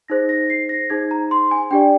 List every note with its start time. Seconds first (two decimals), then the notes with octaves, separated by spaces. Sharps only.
0.08 D#4 G#4 C5 A#6
0.29 A#6
0.50 C7
0.69 A#6
0.90 D#4 G#4 C5 G#6
1.11 A#5
1.31 C6
1.51 G#5
1.71 D4 G4 D5 G5